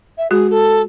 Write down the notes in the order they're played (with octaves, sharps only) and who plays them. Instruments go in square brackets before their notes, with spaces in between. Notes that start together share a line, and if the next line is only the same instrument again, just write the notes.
[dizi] E5
[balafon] G#3 F#4 [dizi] G#4
[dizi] A4